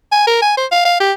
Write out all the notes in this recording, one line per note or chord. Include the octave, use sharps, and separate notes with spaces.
G#5
A#4
G#5
C5
F5
F5
G4